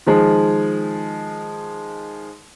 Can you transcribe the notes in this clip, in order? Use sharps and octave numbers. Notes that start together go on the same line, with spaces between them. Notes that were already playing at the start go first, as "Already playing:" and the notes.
D#3 F3 G#3